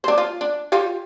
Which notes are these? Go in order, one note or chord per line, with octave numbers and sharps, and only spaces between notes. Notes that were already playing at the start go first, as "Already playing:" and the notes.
D4 C5
F4
D4
F4 G4 F5